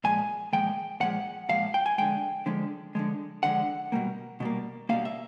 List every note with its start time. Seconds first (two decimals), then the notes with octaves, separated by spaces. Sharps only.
0.04 A#2 F3 G#3 G#5
0.53 A#2 F3 G#3 G5
1.00 A#2 F3 G#3 F#5
1.49 A#2 F3 G#3 F5
1.74 G5
1.86 G#5
1.98 D3 F3 G#3 G5
2.46 D3 F3 G#3
2.95 D3 F3 G#3
3.43 D3 F3 G#3 F#5
3.92 B2 G3 A#3
4.40 B2 G3 A#3
4.89 B2 G3 A#3 F5
5.05 E5